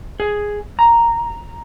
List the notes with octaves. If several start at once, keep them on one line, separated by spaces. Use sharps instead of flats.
G#4
A#5